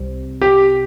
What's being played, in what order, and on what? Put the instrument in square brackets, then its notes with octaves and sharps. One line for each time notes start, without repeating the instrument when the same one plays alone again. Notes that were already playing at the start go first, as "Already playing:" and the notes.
Already playing: [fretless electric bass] C2 C3 G3 C4
[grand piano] G4